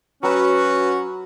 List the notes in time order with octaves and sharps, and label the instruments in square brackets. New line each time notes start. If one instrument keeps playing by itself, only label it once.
[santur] F#3 B5 [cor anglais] C#4 [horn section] F#4 [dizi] B4